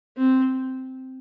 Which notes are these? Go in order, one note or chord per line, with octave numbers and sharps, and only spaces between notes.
C4